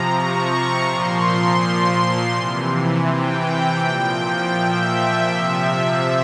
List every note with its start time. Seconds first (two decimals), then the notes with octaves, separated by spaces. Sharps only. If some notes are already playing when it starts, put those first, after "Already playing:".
Already playing: C3 F3 A#5
0.15 C#6
0.87 A#2 F3 C6
2.34 C3 E3
3.08 G5
3.80 A#2 F3 G5
4.55 E5
5.27 C3 F3 E5